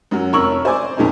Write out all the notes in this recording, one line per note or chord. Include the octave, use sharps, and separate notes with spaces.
F#2 F#3
F1 A#4 C#5 C#6 E6 F#7
C5 D5 G#5 D6
F2 A#2 C#4 D#4